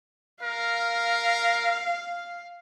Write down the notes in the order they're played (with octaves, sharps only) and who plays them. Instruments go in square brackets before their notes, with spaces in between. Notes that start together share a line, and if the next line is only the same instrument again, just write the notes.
[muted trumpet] A#4 [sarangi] F5